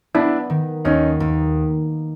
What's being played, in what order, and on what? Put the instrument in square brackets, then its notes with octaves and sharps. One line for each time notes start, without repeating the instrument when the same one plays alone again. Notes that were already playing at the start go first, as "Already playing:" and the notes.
[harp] B3 [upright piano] D4 E4
[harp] D#3
[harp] D#2 [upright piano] C#4 D#4
[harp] D#2